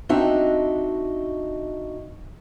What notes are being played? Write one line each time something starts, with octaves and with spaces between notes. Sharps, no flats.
C4 D4 D#4 F#4 D#5 E5